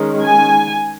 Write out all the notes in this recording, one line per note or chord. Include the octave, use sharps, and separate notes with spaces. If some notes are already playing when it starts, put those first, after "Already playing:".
Already playing: D#3 G#3 C#4
G#5